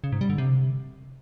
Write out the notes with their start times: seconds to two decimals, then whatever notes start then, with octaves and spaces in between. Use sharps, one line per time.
0.04 C#3
0.12 G#2
0.21 G3
0.30 D3
0.38 C3